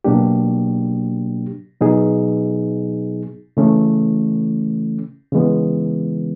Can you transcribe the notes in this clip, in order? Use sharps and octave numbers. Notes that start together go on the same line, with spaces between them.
B2 F#3 A#3 D4 G4
B2 F#3 B3 D#4 G#4
C#3 E3 A3 C#4
C#3 E3 G#3 B3